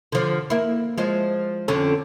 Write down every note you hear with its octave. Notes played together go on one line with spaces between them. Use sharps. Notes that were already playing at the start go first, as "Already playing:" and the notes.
D3 F3
A#3 E4
F3 G#3
F2 D3 C#4